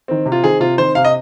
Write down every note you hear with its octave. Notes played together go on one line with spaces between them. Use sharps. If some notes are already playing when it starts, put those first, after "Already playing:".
D#3 C4
C3
F4
D#3 C4 G#4
C3 F4
D#3 C4 C5
C3 F5
D#5